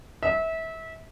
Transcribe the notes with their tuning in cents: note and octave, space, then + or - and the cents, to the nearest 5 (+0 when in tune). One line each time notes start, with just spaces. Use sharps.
E5 -25